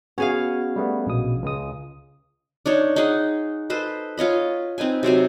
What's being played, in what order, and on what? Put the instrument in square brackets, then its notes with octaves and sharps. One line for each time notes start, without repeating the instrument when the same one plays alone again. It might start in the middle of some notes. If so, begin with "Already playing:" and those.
[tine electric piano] B3 F#4 [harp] C#4 G#4 F5
[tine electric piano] G3 A3 B3
A#1 B2 D#6
C#2 G#3 D#6
[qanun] D4 D#4 C#5
D#4 G#4 F#5
A4 B4 C5 D#5
F4 C#5 D#5 B5
C4 D#4 B4 G#5
C3 F#3 C4 G#5